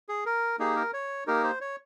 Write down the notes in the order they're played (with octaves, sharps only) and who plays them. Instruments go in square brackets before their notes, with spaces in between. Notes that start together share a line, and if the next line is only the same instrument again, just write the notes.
[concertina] G#4
A#4
A#3 D#4 G4 G#4
A#4
C#5
A#3 D#4 G4 A#4
C5
C#5